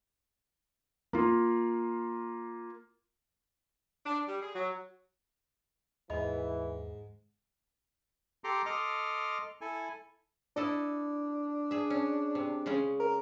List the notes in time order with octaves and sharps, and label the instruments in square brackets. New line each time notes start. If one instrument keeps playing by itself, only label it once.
[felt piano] A#3 F4
[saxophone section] D4
G3
G#4
F#3
[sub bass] D#2 [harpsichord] G#2 [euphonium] E3 [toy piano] D#5 A5 B5
[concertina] G4 A4 A#5 C6 D6
A4 D#5 C6 D6 F6
E4 A4 G#5
[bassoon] D4 [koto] E4 A4 D#5
[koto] G#4 E5
C#4
C3
C#3 G#3 C#4
[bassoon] A#4